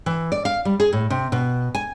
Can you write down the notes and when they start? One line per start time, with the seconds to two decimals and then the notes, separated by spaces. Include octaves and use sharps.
0.06 E3
0.32 D5
0.45 F5
0.65 G3
0.80 G#4
0.93 A2
1.10 C3
1.32 B2
1.75 G#5